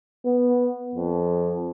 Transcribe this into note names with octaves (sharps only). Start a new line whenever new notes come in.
B3
F2